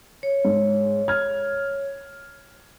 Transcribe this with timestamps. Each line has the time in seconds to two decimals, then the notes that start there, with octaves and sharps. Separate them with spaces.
0.23 C#5
0.45 G#2
1.08 F6 G#6